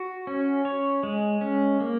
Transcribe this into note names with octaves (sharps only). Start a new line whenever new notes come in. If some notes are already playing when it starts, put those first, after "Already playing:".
Already playing: F#4
C#4
C#5
G#3
C#4
A#3